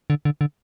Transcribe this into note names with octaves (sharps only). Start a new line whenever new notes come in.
D3
D3
D3